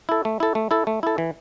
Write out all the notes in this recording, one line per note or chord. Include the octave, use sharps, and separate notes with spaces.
E4 A4
A3
E4 A4
A3
E4 A4
A3
E4 A4
E3